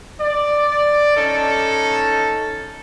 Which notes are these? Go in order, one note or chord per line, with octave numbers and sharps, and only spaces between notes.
D5
C#4 D#4 A4